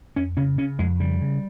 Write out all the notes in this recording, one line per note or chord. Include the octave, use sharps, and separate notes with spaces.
F2 C#4
C#3 C#4
C#3 C#4
F2 G#3
C#3 G3
C#3